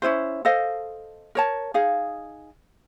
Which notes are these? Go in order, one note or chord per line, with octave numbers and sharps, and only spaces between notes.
C#4 E4 F4 C5
A4 C5 D#5 F5
A#4 C#5 A5
D#4 G#4 F5